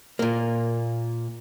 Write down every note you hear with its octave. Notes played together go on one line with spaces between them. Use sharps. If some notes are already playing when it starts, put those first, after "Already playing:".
A#2 A#3